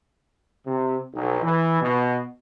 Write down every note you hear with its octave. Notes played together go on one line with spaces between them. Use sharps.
C3
B1
E3
B2